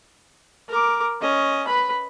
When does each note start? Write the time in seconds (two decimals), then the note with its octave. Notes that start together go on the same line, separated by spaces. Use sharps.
0.69 A#4 D6
1.21 C#4 D#5
1.67 B4 B5